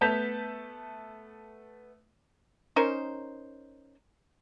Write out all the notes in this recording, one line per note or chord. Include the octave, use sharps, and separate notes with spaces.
A3 B3 A5 G6 B6 F7
C#4 D#4 A#4 C5